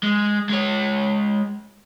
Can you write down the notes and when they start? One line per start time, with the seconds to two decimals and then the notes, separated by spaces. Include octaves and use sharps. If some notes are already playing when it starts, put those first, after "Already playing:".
0.03 G#3
0.49 G#3 C#5